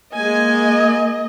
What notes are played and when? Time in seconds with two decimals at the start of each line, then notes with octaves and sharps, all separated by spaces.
0.16 G#3 A#3 D#5 G#5